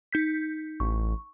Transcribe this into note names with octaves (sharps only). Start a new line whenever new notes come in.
D#4 G6 B6
A1 C#6